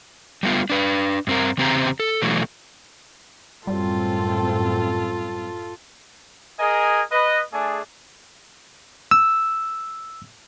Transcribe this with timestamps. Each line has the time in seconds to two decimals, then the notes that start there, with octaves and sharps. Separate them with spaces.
0.43 G3 A3 B3 F4
0.70 D4 B4
1.27 G2 C4 A#4
1.58 E2 C#3 C4 G4 C5 A#5
2.00 A4
2.22 B2 E3 F#3 A3
3.67 F#2 A2 G3 C4 F4 A4
6.59 G#4 A#4 D#5 G#5
7.12 B4 D#5
7.53 A3 D4 G#4
9.11 E6